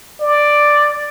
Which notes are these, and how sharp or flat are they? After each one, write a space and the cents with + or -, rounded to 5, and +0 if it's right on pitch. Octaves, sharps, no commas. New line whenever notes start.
D5 +5